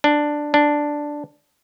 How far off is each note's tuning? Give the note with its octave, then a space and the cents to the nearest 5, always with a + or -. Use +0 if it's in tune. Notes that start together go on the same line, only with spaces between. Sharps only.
D4 +5
D4 +0